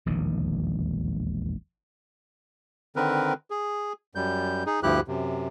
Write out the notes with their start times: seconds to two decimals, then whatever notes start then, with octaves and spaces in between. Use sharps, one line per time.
0.06 E1 A#1 D#2 D#3
2.96 D3 D#3 C4 A#4 B4
3.50 G#4
4.15 F#2 G3 G6
4.66 D#4 G#4
4.83 D2 G2 F3 E4 G4 F#6
5.08 F#2 C3